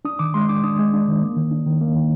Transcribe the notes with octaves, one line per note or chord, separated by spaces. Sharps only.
D4 D#6
D#3 D6
G#3 C6
D4 D6
D4 D#6
G#3
D4
D#3
A#3
D#3
D4
D#3
A#3
D#3